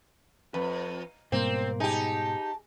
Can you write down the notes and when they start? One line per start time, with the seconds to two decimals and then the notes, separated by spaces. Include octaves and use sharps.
0.54 F2 B4
1.32 G#2 B2 G3 A#3 C4 C5
1.80 D#4 G4 G#4 A5